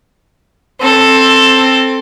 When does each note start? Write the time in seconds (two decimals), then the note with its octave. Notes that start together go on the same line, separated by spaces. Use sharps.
0.80 C4 A4